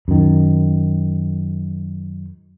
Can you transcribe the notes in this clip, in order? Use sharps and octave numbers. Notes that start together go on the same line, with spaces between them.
F#2 D#3